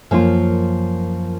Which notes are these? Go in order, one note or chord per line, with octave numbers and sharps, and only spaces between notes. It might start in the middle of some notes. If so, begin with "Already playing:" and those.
F#2 F3 A#3 F4